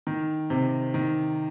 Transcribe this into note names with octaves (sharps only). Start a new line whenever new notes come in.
D#3
C3
D#3